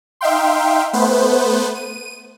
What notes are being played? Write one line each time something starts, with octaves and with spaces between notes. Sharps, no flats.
D#4 E5 F5 G5 C6
A3 B3 B4 C5
D#7